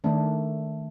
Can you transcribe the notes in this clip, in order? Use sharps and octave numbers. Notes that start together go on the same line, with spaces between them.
D#3 A3 D4